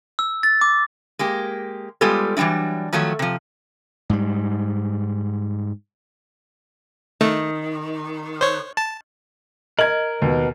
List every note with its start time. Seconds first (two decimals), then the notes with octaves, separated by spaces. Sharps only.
0.19 E6
0.43 A6
0.61 D6
1.19 G#3 A#3 G4
2.01 G3 G#3 B3 F4 G4 A4
2.37 E3 F#3 G3 D4 E4
2.93 D#3 F3 F#3 A3 C#5
3.19 C3 F3
4.10 G#2 G3
7.21 D#3 A3
8.41 C5 C#5
8.77 A5
9.79 A#4 D#5 G#6 F#7
10.22 D#2 B2